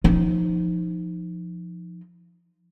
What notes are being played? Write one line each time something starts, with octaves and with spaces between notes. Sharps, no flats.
F3 D#4